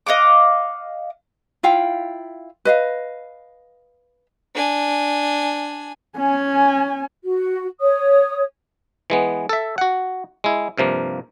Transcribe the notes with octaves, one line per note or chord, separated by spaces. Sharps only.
D#5 F5 F#5 D6
E4 F4 F5 G5
B4 D#5 F5
D4 G#5
C#4 G#5
F#4
C#5 D#6
E3 G#3 B3
A4 E5
F#4 F#5
G#3 E4
G2 C3 F3 A#3